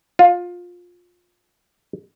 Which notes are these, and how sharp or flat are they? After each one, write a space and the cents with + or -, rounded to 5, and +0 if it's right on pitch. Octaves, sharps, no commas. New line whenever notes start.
F4 +20